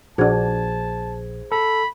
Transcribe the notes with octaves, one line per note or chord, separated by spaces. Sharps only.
A#1 D4 F#4 G#4 C5 A5 G#6
A4 B5